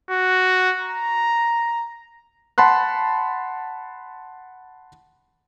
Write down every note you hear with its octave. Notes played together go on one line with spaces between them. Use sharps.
F#4
A#5
F#5 A5 B5 C6 F#6